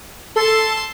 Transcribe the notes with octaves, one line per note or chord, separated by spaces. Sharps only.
A4 A5 C6